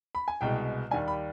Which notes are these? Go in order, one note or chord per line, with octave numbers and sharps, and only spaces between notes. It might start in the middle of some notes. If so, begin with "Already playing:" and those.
B5
G#5
C2 B2 G#3 G5
D#2 D#3 G3 G#5
B5